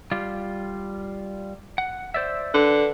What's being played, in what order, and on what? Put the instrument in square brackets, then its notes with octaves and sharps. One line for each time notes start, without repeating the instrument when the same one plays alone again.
[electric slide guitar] G3 F4
F#5
C5 D5 E5
[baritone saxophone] D3 [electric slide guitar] B4